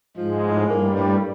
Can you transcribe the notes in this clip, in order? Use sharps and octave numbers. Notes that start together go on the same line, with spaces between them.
G#2 F3 G#3
A2
G2 G3 A#3
A2